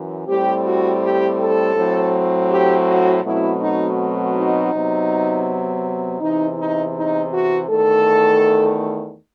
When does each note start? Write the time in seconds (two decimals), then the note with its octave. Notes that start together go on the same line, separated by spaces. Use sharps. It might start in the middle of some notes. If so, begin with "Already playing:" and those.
Already playing: F#2 E3
0.27 A2 G3 C4 G4
0.64 F#4
1.01 G4
1.38 A4
1.75 A2 F#3 C4
2.49 G4
2.87 F#4
3.23 B2 F#3 A3 C4 E4
3.60 D#4
4.35 D#4
4.71 C3 F#3 B3
6.20 E2 C3 E3 D#4
6.57 D#4
6.95 D#4
7.31 F#4
7.68 E2 D#3 A3 A4